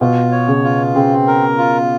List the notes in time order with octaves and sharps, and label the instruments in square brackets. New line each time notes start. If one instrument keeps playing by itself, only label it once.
[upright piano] B2 [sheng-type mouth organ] F4
[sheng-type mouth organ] C#5
[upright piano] C#3
[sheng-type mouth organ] F4
[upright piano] C#3 [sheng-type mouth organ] C4
[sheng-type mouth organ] A#4
F4